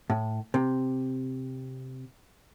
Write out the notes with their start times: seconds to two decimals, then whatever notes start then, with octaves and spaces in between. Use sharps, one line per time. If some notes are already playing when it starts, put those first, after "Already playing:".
0.10 A2
0.54 C3